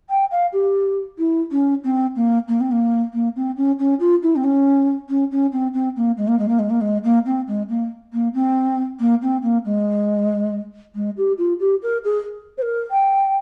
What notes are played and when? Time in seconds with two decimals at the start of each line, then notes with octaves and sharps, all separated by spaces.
0.09 G5
0.31 F5
0.52 G4
1.18 E4
1.51 C#4
1.83 C4
2.15 A#3
2.48 A#3
2.60 C4
2.71 A#3
3.13 A#3
3.36 C4
3.56 C#4
3.79 C#4
4.00 F4
4.22 E4
4.35 C4
4.43 C#4
5.09 C#4
5.31 C#4
5.52 C4
5.73 C4
5.96 A#3
6.17 G#3
6.27 A#3
6.39 G#3
6.48 A#3
6.59 G#3
6.69 A#3
6.80 G#3
7.03 A#3
7.25 C4
7.47 G#3
7.68 A#3
8.13 A#3
8.34 C4
8.99 A#3
9.22 C4
9.42 A#3
9.65 G#3
10.95 G#3
11.17 G4
11.38 F4
11.59 G4
11.82 A#4
12.04 G#4
12.57 C5
12.62 A#4
12.90 G5